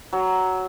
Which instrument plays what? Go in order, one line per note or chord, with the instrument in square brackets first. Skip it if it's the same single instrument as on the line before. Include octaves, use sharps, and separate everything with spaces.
[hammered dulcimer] F#3